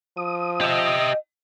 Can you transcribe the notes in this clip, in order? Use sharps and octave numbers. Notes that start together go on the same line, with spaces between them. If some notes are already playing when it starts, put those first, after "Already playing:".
F3 D#6
G4 D#5 E5